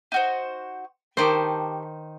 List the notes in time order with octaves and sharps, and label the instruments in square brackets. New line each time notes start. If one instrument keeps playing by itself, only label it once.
[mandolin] D#4 F#4 C5
[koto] D#3 C5 [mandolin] G4 A5 C#6